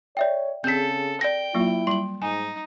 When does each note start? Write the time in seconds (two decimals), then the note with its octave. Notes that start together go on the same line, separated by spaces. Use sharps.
0.17 C#5 D5 E5 G5
0.64 C#3 C4 G#4 A4 G6 B6
1.21 D5 G5 A#6
1.55 F#3 A#3 E4 F4
1.87 G3 C6 F#7
2.22 G#2 D#4 G#5